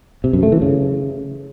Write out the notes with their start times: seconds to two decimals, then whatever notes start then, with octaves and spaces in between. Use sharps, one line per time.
0.24 C3
0.33 F#2
0.43 A3
0.52 E3
0.62 C#3